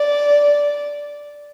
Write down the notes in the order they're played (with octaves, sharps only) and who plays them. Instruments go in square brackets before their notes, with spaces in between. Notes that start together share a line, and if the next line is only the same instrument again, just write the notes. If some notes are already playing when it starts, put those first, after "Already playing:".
Already playing: [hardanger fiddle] D5